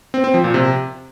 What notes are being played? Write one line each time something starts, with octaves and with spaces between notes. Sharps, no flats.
C4
C4
F3
A#2
C3